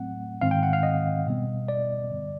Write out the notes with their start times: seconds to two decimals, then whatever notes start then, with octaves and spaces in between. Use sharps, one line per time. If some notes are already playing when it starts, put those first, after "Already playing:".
Already playing: A2 F#3 A3 C4 F#5
0.41 G#2 D#3 G#3 C4 F5
0.51 G5
0.63 F#5
0.73 F5
0.83 D#5
1.26 B2 G3 B3
1.68 D5
2.10 G2 D3 G3